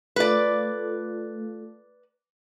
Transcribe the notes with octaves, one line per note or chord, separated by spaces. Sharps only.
A3 F4 A4 B4 D5